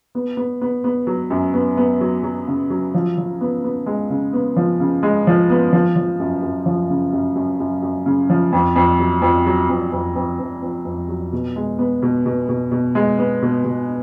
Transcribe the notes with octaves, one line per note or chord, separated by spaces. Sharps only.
B3
B3
B3
B3
F#3
F#2
B3
B3
F#3
F#3
C#3
F#3
F3
F3
B3
B3
G#3
C#3
B3
F3
C#3
G#3
F3
B3
F3
F3
F#2
F#2
F3
C#3
F#2
F#2
F#2
F#2
C#3
F3
F2
F2
F#3
F2
F#3
F2
F2
F2
F2
F2
F2
F#3
B2
G#3
B3
B2
B2
B2
B2
G#3
B3
B2
B2